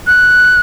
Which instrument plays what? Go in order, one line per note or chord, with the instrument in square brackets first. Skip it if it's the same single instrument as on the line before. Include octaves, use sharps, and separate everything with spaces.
[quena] F#6